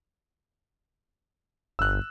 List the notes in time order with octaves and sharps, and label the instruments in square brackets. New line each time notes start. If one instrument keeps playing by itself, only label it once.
[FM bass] G1 [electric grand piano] E6 F#6